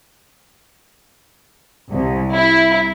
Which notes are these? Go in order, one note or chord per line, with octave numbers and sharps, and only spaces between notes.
C2
E4